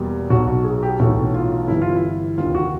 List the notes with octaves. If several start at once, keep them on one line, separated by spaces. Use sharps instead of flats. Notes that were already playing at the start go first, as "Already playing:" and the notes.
Already playing: E2 B2 G3 A#3
B1 B2 F#3 F#4
F#4
G#4
G4
B1 A2 E3 A3 F#4
F4
G1 G2 E3 E4
F4
E4
F1 D#2 D3 F4
F#4